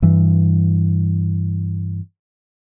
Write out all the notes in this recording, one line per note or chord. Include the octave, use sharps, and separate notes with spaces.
G2 E3